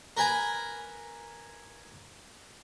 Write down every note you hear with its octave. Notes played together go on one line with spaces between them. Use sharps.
A#4 B4 G#5 A#5